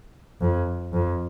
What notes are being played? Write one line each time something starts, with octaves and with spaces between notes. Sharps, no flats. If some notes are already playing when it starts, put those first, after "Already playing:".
F2
F2